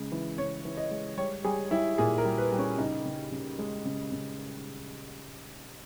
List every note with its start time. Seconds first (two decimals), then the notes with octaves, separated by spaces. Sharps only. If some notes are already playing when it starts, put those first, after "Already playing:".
Already playing: C#3 G#3
0.12 E3
0.38 C#3 C#5
0.65 E3
0.77 D#5
0.91 G#3
1.17 G3 C#5
1.44 G3 G#4
1.71 G3 E4
1.98 A#2 G#4
2.18 A#4
2.25 G3
2.38 B4
2.52 G3
2.59 C#4
2.78 C#3 D#4
3.05 C#3
3.32 C#3
3.59 G#3
3.85 C#3
4.12 C#3